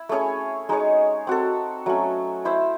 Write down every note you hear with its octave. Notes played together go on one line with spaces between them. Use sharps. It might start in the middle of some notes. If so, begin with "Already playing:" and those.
Already playing: E4
A3 C#4 G#4 C#5
G#3 D#4 G#4 C#5
C4 F#4 A4
F#3 A3 C#4
E4 C5 E5